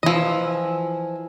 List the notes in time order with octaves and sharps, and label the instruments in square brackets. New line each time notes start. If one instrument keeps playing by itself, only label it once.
[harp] E3 B4 E6 [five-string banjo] F3 D#5
[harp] G#5 E6